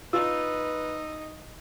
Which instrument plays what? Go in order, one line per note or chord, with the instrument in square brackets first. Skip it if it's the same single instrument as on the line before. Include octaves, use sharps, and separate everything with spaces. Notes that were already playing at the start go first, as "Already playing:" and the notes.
[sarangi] D#4 [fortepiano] F4 [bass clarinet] B4 [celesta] E6